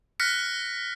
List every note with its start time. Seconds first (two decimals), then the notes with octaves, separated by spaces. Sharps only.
0.20 F6 F#6 A#6 B6 C#7